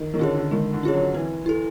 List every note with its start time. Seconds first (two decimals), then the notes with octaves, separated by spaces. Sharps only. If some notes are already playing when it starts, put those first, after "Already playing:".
Already playing: D#3
0.14 D#3
0.19 D3 C#4 F4 G#4 C#5
0.35 D3
0.51 D#3 G#3
0.73 D3
0.83 C#4 F4 G#4 C#5
0.93 F#3
1.14 E3 C4
1.46 E4 A4